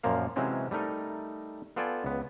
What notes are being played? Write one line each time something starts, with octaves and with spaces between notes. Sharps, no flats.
F#2 A#2 F3 A#3 F5
C3 E3 F#3 G#3 C4 C#4
G3 A3 D#4 A#4 D#5
B3 F4 A4 D5 G5 G#5
C#2 B3